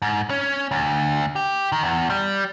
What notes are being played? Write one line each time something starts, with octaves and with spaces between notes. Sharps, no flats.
G#2
C#4
D2
G4
D#3
E2
G3